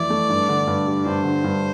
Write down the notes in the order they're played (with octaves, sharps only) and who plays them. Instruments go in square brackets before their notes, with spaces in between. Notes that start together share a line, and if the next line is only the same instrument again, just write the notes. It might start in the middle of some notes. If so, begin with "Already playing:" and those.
Already playing: [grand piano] F2 E3 A3 E4 [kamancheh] D5
[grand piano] A3
G2
D3
G2
G3
[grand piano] G2 [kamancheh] C5
[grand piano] D3
G2